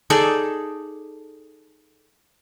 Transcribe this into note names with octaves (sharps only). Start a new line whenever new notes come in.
D#4 G#4 A4 D5